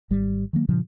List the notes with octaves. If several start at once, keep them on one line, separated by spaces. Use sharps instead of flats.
G#1 G3
D#3 F#3 A#3
G2 A#2 C#3 F3